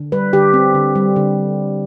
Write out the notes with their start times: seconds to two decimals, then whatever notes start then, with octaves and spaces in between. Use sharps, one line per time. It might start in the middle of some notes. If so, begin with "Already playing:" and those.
Already playing: D3
0.12 G3 B4
0.33 D3 G4
0.54 C4
0.74 D3
0.95 G3
1.16 D3